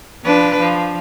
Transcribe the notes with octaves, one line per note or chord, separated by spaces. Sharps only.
F3 D4 B4
F3